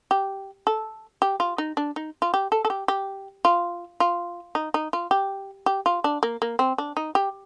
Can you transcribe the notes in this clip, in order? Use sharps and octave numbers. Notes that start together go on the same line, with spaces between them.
G4
A4
G4
F4
D#4
D4
D#4
F4
G4
A4
A4
G4
G4
F4
F4
D#4
D#4
F4
G4
G4
F4
D4
A#3
A#3
C4
D4
D#4
G4